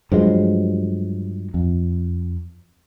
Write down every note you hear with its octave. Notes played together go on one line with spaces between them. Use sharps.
G2 F3 F#3 G#3
F2